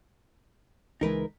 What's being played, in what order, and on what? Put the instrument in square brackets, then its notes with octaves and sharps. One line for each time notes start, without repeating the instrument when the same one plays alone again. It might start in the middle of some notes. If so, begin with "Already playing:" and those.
[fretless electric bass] C#2 E3 G#3 [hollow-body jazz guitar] D#4 A#4 B4